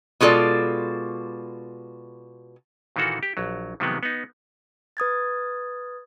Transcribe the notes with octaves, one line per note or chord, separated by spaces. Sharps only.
B2 G#3 F4 A4 D5
A#2 D#3 E3 A#3 F#4 A4
G4
A#1 F#3
C3 D#3 F3 F#3 G#3 B3
B3 D#4
B4 D#6 G#6 A6